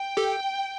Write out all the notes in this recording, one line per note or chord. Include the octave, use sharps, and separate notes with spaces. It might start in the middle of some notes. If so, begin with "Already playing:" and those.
Already playing: G5
G4 A4